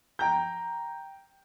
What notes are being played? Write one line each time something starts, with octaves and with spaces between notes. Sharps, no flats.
G5 A#5 G6